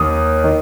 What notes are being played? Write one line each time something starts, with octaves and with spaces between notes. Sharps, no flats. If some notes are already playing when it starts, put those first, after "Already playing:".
Already playing: D#2 D#3 D#6
D#3